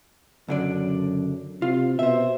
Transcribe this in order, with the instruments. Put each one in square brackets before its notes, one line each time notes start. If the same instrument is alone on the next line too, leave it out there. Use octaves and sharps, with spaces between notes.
[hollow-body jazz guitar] C#2 D3 D5 [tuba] F#2
[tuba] C3 [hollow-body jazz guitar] F4
[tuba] B2 [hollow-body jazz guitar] C5 E5